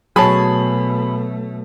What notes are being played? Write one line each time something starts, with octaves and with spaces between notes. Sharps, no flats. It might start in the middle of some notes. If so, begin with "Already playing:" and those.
B2 F#3 A3 G#4 C#5 A5 B5